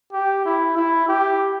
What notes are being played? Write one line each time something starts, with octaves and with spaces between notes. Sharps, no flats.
G4
E4
E4
G4